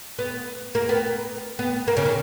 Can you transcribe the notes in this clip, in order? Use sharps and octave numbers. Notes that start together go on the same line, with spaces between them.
B3
A#3
B3
B3
A#3
C#3
D#3